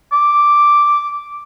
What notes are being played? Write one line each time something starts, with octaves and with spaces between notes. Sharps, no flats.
D6